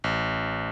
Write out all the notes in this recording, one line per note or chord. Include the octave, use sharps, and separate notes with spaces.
A1